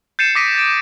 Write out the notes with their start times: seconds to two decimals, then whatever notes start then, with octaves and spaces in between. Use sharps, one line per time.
0.19 G6 A6 C7 C#7 D#7 E7
0.35 D6 D#6 A#6 B6 D7 D#7
0.55 A6 D7